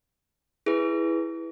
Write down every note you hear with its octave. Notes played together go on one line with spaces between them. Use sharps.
E4 G#4 B4